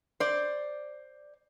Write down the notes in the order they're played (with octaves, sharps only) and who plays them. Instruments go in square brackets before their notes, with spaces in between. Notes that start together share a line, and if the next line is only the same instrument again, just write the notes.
[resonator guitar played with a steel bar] C5 D5